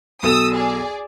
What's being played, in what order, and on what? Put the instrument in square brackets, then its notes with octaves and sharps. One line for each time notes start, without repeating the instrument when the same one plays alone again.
[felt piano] B1 A4 E7 [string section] D#6 E6
[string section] G#4 D5